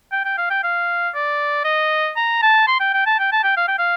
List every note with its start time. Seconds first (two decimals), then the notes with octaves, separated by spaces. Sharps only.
0.12 G5
0.25 G5
0.38 F5
0.50 G5
0.64 F5
1.15 D5
1.65 D#5
2.16 A#5
2.42 A5
2.68 C6
2.80 G5
2.94 G5
3.06 A5
3.19 G5
3.32 A5
3.44 G5
3.57 F5
3.68 G5
3.79 F5